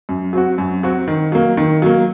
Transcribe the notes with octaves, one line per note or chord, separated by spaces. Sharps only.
F#2
F#3 C4 F#4
F#2
F#3 C4 F#4
D#3
F#3 A#3
D#3
F#3 A#3